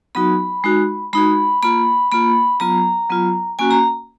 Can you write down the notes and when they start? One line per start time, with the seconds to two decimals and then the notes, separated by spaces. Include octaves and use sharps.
0.15 F#3 B3 D#4 F#4 B5
0.64 G#3 D#4 F#4
1.13 G#3 D#4 F#4 B5
1.63 A#3 F4 B5
2.12 A#3 F4 B5
2.60 F#3 B3 F4 A#5
3.09 F#3 B3 F4
3.59 A#3 C#4 F#4 G#5
3.71 A#5